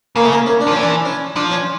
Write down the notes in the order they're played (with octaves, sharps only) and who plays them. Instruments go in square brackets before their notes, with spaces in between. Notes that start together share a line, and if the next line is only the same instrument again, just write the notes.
[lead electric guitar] C#3 [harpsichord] A#3
[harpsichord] A3
A#3
C#4
D4
[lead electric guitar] F3
[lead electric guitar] E3 [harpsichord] C#4
[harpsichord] D4
C#4
[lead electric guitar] F3 [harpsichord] D4
[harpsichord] C#4